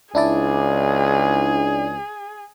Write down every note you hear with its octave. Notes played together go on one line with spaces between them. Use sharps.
C#2 D4 E4 G#4 D5